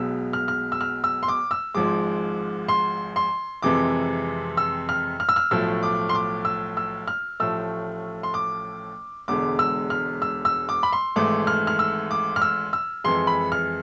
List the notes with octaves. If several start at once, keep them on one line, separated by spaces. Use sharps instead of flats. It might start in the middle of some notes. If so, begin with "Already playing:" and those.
Already playing: B1 B2 G#3 E6
F6
F6
E6
F6
E6
C6
D6
E6
G#1 G#2 F3 G#3 D6
C6
C6
F2 C3 E3 G#3 D6
E6
F6
F6
E6
F6
B1 A2 F3 A3 E6
D6
C6
D6
E6
E6
F6
A1 A2 F3 A3 E6
C6
D6
E1 E2 D3 G#3 D6
E6
F6
E6
E6
D6
B5
C6
G#1 G#2 E3 A3 D6
F6
F6
E6
D6
F6
E6
E6
F2 E3 G#3 C6
B5
F6